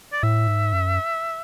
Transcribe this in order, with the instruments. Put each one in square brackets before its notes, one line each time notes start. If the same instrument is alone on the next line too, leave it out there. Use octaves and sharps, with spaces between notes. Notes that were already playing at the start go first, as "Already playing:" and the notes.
[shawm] D5
[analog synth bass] A2 [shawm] E5
[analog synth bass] G#2
F#2